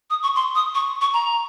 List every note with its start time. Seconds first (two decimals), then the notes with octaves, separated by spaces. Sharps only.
0.10 D#6
0.23 C#6
0.36 C6
0.55 D#6
0.75 C#6
1.01 C#6
1.14 A#5